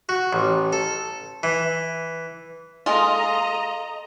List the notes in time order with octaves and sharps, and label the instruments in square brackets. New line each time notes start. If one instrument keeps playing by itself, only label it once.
[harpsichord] F#4
A1
A4
E3
[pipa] G#3 F4 [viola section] A4 D#5 A#5